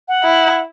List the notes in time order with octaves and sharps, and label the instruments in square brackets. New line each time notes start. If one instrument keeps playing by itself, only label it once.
[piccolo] F#5
[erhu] E4